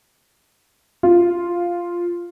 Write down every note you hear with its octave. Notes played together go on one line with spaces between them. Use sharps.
F4